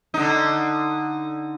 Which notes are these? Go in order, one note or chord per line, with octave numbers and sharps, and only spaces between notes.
D3 D#4